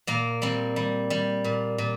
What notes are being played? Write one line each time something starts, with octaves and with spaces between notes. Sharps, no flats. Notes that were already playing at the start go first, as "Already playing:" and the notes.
A#2 A#3
G3 C4
G3
G3
A#2
A#2